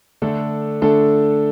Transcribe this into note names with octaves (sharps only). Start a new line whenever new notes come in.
D3 A3 D4 A4
D3 A3 D4 A4